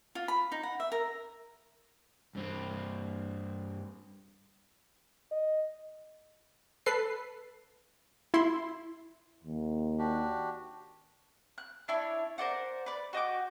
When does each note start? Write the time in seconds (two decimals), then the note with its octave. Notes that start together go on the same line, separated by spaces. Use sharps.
0.15 F4
0.28 B5
0.52 D#4
0.63 F#5
0.80 E5
0.92 A#4
2.35 G2 C4
5.32 D#5
6.86 A4 B4 C7
8.34 E4 C6
9.43 D#2
9.99 D4 F#4 G4
11.58 F#6
11.88 D4 E4 C#5
12.38 A#4 C5 D5 F#5
12.86 B4 D5
13.13 F#4 D#5 G5 D6